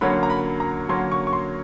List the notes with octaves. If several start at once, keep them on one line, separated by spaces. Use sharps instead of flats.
D3 F#3 A#3 C#4 B5
A#5
B5
A#5
D3 F#3 A#3 C#4 C6
C#6
C#6
C6